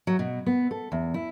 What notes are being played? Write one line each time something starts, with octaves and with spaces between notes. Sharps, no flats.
F#3
B2
B3
A4
E2
E4